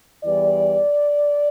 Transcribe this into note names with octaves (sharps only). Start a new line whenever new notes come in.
E2 E3 G3 D5